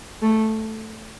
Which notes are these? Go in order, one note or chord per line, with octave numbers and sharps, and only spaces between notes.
A3